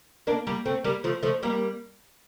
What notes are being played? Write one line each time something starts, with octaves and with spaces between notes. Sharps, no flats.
A#3 D4
G3 A#3
A3 C4
G3 A#3
F3 A3
F3 A3
G3 A#3